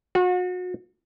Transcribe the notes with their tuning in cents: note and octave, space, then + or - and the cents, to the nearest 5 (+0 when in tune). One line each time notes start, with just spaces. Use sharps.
F#4 -35